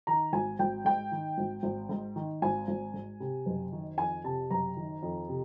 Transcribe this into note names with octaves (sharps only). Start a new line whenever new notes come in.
D#3 A#5
G#1 G#5
G#1 G5
G#2 G5
D#3
G#1
G#1
G#2
D#3
G#1 G#5
G#1
G#2
C3
F#1
D#3
F2 G#5
C3 A5
F#1 A#5
D#3
F2
C3